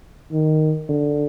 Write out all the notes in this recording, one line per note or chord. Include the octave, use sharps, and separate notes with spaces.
D#3
D3